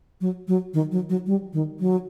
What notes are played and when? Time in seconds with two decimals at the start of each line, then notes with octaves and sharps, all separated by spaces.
0.21 F#3
0.48 F#3
0.74 D#3
0.92 F#3
1.10 F#3
1.27 G3
1.53 D#3
1.80 F#3